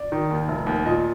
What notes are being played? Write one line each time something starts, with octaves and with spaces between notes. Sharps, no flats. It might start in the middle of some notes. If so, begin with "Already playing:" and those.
Already playing: D5
D#3
D#2
F1
D#2
A#2 D#5